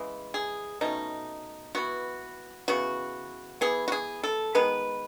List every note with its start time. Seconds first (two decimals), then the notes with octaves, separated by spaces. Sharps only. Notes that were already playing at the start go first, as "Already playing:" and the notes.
Already playing: C#3 E3 G#3
0.34 G#4
0.81 B2 A3 C#4 D#4
1.75 E3 B3 F#4
2.68 C#3 E3 B3 F#4
3.61 E3 B3 G#4
3.88 F#4
3.92 G#4
4.23 A4
4.55 D#3 G#3 B3 B4